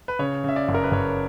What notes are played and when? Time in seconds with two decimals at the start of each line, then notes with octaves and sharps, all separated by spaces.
0.08 B4
0.19 C#3 C#5
0.44 C#3 E5
0.56 D5
0.69 F#1
0.74 A#4
0.83 B4
0.92 F#1 C#5